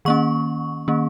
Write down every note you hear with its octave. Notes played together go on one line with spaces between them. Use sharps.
D#3 A#3 C#4 C#6
D#3 A#3 C#4